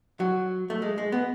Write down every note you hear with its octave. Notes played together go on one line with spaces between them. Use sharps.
F#3
A3
G#3
G#3
B3